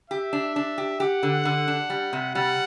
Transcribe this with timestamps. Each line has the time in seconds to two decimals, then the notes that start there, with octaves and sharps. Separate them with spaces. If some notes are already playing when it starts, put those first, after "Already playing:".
0.10 G4 E5
0.33 D4
0.56 D4
0.78 G4
1.00 G4 F#5
1.23 D3
1.45 D3
1.68 D4
1.90 G3
2.13 C3
2.35 G3 F#5